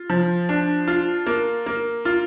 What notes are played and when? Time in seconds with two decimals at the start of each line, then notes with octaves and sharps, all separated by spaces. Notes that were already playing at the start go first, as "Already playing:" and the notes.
Already playing: F4
0.10 F3
0.49 D4
0.88 F4
1.26 A#3
1.66 A#3
2.05 F4